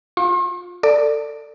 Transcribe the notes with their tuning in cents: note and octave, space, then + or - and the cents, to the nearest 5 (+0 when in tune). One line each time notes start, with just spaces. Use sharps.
F4 +20 C6 +45
A4 +25 D5 +0